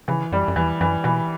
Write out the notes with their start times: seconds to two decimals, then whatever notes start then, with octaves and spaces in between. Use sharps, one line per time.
0.08 C#3 E3
0.32 F#2 G3
0.48 F#2
0.56 E2 E3
0.81 F#2 E3
1.04 B2 E3